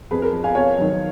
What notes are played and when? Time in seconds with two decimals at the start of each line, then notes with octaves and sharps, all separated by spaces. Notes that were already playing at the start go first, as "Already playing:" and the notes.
0.11 F2 G#4 B4
0.22 A#4
0.33 F3
0.44 F5 G#5
0.55 F2 C#5 F5
0.78 D#3 F#3